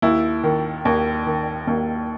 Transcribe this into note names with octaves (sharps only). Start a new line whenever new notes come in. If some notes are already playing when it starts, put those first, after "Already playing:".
D#2 E4
D#3
D#2
D#3
D#2